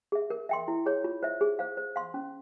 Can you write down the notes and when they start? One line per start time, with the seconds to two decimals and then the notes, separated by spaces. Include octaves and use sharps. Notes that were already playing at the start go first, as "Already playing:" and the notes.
0.12 G#4 E5
0.30 A#4
0.49 E5 G5 C6
0.68 E4
0.86 G#4 C#5
1.04 F4
1.23 C5 E5
1.41 G#4
1.59 C5 F5
1.77 C5
1.96 F5 C6
2.14 C#4